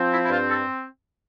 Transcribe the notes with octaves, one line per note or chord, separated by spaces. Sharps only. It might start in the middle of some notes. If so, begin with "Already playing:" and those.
Already playing: F3 C4
E4
E4
G2 F4
A4